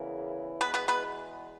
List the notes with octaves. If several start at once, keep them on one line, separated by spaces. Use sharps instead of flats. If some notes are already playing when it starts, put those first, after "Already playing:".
Already playing: E2 C#3 E3 A#3 E4
E2 B2 G#3 B3 B4
B3 B4
B3 B4